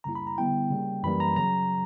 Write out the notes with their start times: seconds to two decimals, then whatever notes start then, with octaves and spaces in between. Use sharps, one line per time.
0.04 F#2 C#3 G3 A#3 E4 A#5
0.15 B5
0.27 A#5
0.38 D3 G3 B3 E4 G5
0.71 C#3 G3 A#3
1.03 F#2 E3 G3 A#3 B5
1.20 A#5
1.36 C#3 F#3 A#5